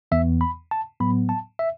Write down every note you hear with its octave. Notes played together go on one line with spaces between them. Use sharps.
E2 E3 B3 E5
B5
A5
A2 F#3 B3 B5
A5
E5